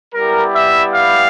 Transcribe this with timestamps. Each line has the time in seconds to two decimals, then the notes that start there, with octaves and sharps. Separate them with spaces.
0.14 G3 B3 E4 G4 A#4
0.55 E5
0.94 F5